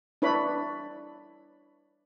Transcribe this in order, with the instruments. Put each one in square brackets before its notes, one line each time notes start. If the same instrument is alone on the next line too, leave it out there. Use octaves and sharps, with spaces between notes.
[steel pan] D4 E4 B4 C#5 B5